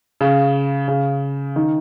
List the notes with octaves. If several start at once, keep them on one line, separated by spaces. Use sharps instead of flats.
C#3
C#3
D#3